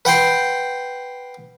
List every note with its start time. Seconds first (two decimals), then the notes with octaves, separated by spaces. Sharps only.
0.05 B4 F#5 G5 C6